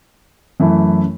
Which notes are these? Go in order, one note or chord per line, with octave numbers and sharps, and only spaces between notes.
F#2 E3 A3 E4